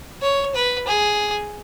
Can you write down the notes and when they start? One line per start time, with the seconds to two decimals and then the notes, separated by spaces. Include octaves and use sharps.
0.22 C#5
0.55 B4
0.87 G#4